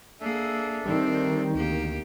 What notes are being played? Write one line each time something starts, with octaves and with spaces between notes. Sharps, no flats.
A#3 D4 G#4 A4 E5
D#3 G3 C4
D2 A#3 G4